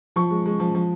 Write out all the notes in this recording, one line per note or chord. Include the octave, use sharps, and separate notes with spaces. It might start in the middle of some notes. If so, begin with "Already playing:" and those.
F3 C#6
G#3
G#3
F3
F3